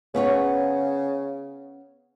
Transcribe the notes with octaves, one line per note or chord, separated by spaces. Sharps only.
C#3 B3 C#4 C#5